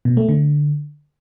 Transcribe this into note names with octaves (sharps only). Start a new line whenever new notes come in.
B2
A3
D3